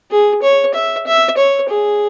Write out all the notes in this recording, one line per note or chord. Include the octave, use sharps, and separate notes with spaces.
G#4
C#5
E5
E5
C#5
G#4